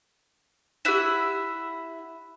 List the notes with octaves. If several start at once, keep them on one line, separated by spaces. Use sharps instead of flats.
E4 G4 E5 F#5 E7